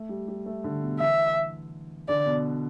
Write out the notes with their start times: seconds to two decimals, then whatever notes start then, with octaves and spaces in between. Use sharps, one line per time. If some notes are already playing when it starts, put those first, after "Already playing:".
Already playing: A3
0.09 G3
0.28 G3
0.46 A3
0.64 D3
0.82 B2
1.00 E3 E5
2.09 D3 D5
2.26 B2